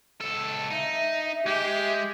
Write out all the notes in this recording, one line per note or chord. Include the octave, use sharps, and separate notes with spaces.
C#2 A4
D#4 E5
G#3 G4